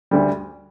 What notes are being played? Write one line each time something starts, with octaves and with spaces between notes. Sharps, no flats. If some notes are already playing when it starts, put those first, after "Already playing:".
D2 D3 G3